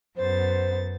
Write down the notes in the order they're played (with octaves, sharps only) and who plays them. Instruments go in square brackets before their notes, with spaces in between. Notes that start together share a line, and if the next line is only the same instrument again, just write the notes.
[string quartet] F#2 B3 A6 [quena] C5